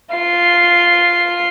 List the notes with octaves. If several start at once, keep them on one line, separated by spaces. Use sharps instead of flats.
F4 C7